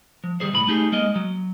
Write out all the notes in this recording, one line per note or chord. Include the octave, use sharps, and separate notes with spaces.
F3
D#3 G3 G#4 C5
B1 A2 B5
A3 D#4 G4 G#4
G#3 A#3 D#5
F#3